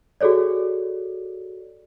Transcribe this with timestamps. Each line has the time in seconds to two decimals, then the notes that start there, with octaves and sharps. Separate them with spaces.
0.21 F#4 G#4 A4 C#5 D5